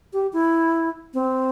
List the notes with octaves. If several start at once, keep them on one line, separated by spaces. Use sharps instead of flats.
G4
E4
C4